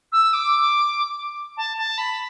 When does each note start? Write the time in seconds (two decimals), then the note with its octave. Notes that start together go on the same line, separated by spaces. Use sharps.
0.12 E6
0.33 D6
1.56 A5
1.77 A5
1.97 B5